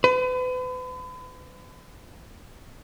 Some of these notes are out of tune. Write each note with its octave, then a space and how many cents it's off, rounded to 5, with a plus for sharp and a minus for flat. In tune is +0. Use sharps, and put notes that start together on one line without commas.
B4 +40